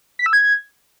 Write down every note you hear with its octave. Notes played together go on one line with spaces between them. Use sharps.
B6
E6
G#6